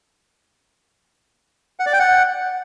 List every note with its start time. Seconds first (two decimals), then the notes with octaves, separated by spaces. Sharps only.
1.80 F#5
1.86 D5
1.93 G5
1.99 F#5